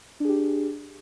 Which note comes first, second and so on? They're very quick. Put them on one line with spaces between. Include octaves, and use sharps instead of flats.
D4 G#4 G4